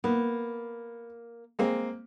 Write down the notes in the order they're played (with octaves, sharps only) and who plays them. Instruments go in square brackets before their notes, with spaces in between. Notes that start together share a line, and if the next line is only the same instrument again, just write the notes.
[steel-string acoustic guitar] A#3 [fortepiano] B3
[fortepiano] G#3 A#3 C4